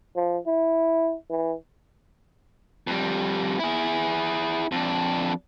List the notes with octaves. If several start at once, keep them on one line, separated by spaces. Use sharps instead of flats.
F3
E4
E3
F2 G3
E4 G#4
F2 D4